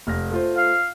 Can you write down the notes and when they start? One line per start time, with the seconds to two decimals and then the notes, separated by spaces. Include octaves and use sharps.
0.07 F1 F6 A#6
0.31 A3 F4 C5
0.56 F5